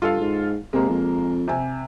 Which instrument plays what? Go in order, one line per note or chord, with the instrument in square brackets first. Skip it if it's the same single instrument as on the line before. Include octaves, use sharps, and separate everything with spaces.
[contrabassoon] G2 [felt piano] F4 A4 F5
[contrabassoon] G#2
[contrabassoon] C3 [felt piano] G#3 A#3
[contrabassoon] F2
[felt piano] C3 G#5